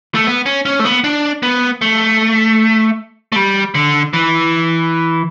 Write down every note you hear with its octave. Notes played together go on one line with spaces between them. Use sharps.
A3
B3
C#4
C#4
A3
B3
D4
B3
A3
A3
G3
D3
E3